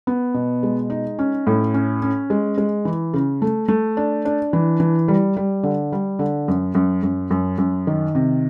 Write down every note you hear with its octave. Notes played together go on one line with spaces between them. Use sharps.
B3
B2
G#3
D#4
C#4
A2
C#4
C#4
G#3
G#3
E3
C#3
A3
A3
D4
D4
E3
E3
G3
G3
D3
G3
D3
F#2
F#2
F#2
F#2
F#2
D#3
C3